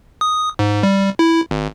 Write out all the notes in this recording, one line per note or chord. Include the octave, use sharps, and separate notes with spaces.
D#6
G#2
G3
E4
G#1